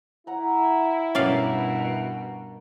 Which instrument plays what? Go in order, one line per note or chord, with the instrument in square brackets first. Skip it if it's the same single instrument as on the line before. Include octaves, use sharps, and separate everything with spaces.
[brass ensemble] E4 [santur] F#5 A#5
[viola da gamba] G2 B2 [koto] C#4 D5 F5 [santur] A#4 G5 C#6
[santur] D#5